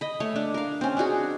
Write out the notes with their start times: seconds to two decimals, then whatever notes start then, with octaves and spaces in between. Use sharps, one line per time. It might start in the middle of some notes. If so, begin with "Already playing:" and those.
0.01 D#5 B5
0.20 A3 C#5
0.36 D4
0.54 A#4 F5
0.81 C4 C#4
0.97 D4 D#4 F#4 G#4